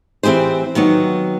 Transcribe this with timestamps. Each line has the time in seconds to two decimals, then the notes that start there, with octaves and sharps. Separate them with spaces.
0.23 E3 C4 G4 G#4 C5
0.75 D#3 F#3 B3